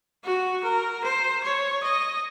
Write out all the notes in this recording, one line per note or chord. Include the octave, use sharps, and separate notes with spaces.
F#4
A#4
C5
C#5
D#5